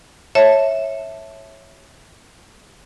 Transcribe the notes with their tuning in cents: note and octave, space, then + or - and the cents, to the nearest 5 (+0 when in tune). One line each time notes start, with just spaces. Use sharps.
C#5 -10 E5 -5 A5 +0